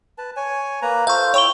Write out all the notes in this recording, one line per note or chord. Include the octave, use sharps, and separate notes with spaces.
B4 A5
C#5 G#5
A#3 B4 A#5
F4 A4 C5 F5 C#6
E4 C#5 G5 C#6 G7